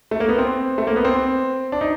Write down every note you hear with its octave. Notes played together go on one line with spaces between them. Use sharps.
A3
A#3
B3
C4
A3
A#3
B3
C4
D4
D#4